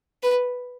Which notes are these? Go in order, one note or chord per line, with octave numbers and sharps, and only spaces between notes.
B4